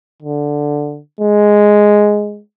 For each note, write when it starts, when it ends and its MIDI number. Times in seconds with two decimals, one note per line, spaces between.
0.23 1.00 50
1.20 2.41 56